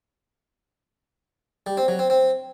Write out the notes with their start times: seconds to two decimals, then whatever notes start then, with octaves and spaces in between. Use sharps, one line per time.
1.67 G3
1.77 C4
1.88 F#3
1.99 C4
2.10 C4